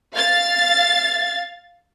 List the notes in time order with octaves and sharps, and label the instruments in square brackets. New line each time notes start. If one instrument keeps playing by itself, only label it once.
[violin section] F5 A6